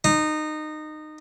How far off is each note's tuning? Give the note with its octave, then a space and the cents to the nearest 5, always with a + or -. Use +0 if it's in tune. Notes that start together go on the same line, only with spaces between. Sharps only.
D#4 -20